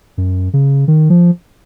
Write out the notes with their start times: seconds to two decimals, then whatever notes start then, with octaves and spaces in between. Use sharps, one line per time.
0.18 F#2
0.53 C#3
0.88 D#3
1.10 F3